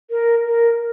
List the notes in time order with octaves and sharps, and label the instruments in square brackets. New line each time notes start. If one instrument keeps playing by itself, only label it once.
[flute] A#4
A#4